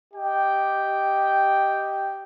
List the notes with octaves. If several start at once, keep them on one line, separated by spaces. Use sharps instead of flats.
G4 D#5 G5